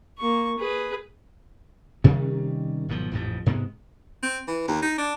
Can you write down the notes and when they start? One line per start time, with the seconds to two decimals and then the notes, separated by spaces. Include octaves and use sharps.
0.18 A#3 C#6
0.59 G#4 B4
2.04 C3 D#3 G3 C#4
2.89 G#1 B2 F3 F#3
3.11 A1 F2 G#2 F3
3.46 G#2 C3 G#3 B3
4.23 C4
4.47 E3
4.68 D#2
4.82 D#4
4.98 D4